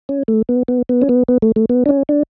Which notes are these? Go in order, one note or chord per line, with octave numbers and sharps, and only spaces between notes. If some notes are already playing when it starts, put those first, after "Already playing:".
C#4
A3
B3
B3
B3
C#4
B3
B3
A3
A3
B3
D4
C#4
D4